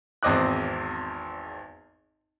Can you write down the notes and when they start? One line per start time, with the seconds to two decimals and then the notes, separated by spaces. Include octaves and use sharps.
0.23 G#1 E2 C4 D#5 D6 F#6